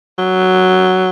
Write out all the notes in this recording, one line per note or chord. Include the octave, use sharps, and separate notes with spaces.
F#3